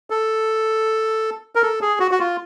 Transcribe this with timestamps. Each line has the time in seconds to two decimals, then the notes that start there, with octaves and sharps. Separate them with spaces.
0.10 A4
1.55 A#4
1.62 A4
1.82 G#4
2.00 F#4
2.11 F#4
2.19 F4